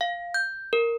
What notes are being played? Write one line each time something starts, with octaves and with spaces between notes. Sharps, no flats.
F5
G6
A#4